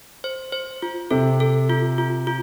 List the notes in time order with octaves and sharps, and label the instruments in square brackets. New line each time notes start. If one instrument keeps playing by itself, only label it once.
[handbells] C5
C5
F4
[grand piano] C3 [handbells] A4
[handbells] A4
F4
F4
F4